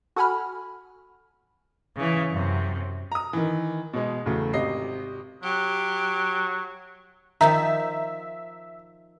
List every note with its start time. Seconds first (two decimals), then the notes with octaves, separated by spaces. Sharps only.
0.16 F#4 A4 F#5 G#5 B5 F6
1.96 C#3 E3
2.31 F#2 C3
3.12 A#5 D#6
3.33 D#3 E3
3.93 B2 G#3
4.26 E2 C#3 F#3 A3
4.53 G#1 C3 D#5 C7
5.43 F#3 G4
7.41 D#3 F3 D#4 E5 A#5